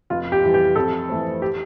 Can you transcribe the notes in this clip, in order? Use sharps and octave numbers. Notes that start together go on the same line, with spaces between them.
F1 F4
G4
F2 E3 G3
G4
F2 A4
E3 A3 C4
G4